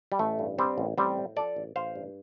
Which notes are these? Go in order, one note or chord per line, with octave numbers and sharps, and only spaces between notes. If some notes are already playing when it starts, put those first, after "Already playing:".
G3
A1 A3
G2
G3 C4
A1
A1 G3 C4
A2
F3 A4 D5
A1
A1 C5 F5
G2